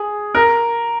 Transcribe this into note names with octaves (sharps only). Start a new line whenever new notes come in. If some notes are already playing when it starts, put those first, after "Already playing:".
Already playing: G#4
A#4